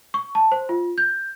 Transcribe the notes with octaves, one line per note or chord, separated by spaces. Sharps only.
C#6
A5
C5
F4
G6